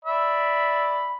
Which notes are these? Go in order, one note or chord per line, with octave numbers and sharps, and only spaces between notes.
D5 E5 B5